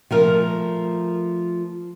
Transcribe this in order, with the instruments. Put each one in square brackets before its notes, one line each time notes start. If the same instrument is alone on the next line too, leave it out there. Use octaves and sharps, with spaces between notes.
[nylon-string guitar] F3 A3 A#4